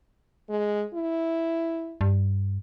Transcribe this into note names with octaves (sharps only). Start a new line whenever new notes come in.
G#3
E4
G2